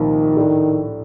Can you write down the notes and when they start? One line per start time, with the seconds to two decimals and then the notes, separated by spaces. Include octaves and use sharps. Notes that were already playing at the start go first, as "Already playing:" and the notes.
Already playing: C2 A#2 D#3 F3
0.37 A2 A3 D4